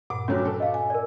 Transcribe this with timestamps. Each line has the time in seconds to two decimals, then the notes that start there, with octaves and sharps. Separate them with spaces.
0.10 G2 A#2 F#5 D6
0.28 F1 D3 F#3 C#4 F#4
0.45 A4
0.60 D#5 F5
0.74 G#5
0.90 A#4 D5